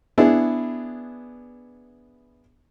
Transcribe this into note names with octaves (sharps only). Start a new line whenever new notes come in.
B3 D4 E4 G#4